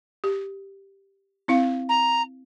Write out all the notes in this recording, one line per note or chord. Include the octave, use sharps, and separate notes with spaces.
G4
C4 E4 F5
A#5